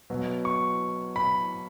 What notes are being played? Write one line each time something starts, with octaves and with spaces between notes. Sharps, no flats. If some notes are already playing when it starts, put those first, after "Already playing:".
B2 F#3
C#6
B5